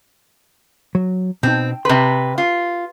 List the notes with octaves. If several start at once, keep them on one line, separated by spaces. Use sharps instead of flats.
F#3
B2 C4 D#4
C3 B4 C6
F4